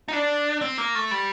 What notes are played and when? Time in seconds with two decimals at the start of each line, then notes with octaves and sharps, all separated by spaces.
0.08 D#4
0.13 D4
0.61 C4
0.78 A#3
0.95 A3
1.11 G3